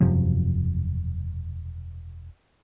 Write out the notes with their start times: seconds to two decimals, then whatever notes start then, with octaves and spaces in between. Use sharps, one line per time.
0.01 E1 F#2 C3 F3